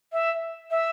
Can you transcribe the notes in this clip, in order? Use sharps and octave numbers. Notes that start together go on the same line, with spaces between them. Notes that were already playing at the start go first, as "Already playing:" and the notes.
E5
E5